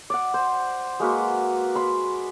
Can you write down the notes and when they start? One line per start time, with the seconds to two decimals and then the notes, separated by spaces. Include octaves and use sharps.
0.10 D5 F#5
0.34 C5
1.00 G#3 A#3 F#4 B4
1.75 B5 C6